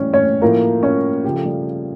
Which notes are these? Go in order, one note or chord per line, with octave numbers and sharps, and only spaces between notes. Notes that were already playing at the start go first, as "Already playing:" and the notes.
Already playing: A2 E3 G3 C#4 C#5
C#4 C#5
A2 F3 A#3 A#4
C#4 C#5
C#3 F3 G4
A4
G3 G4